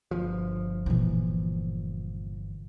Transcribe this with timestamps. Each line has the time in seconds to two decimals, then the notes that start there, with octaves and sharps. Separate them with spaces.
0.11 G1 F3
0.86 A#2 E3